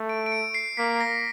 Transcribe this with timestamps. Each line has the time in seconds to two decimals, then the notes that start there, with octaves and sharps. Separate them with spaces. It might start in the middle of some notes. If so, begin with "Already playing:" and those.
Already playing: A3
0.09 D7
0.26 D7
0.32 C#7
0.54 C7
0.77 A#3 B6
1.01 A#6